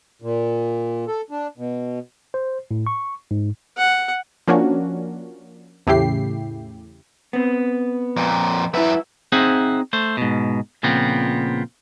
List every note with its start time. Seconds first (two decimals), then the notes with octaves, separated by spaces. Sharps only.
0.22 A#2
1.07 A4
1.30 D4
1.57 B2
2.34 C5
2.71 A2
2.87 C#6
3.31 G#2
3.77 F#5
4.47 F3 A#3 C#4 D4 F#4
5.87 E2 A2 C#3 E4 G4 C7
7.33 B3 C4
8.16 F2 A#2
8.74 F#3 E4 B4 E5
9.32 C4 D#4 G#4 C5 E5 F#5
9.93 A3 C5
10.17 G#2 B2
10.83 A#2 C#3 F3 B3 C4